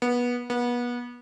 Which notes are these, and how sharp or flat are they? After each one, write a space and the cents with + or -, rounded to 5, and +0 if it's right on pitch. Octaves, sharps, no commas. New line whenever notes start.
B3 -20
B3 -30